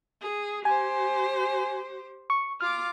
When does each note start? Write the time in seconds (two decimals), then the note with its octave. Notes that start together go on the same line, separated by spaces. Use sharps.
0.22 G#4
0.65 G4 C5 G#5
2.30 C#6
2.61 F4 D6 F6